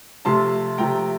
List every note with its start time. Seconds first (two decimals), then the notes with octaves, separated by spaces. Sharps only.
0.25 C3 F3 A3 A5 C6
0.78 C3 F3 A3 G5 A#5